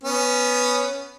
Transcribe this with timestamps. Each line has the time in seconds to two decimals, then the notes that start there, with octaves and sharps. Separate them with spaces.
0.03 B3 C#4